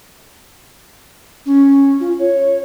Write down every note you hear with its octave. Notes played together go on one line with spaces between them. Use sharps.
C#4
F4
C#5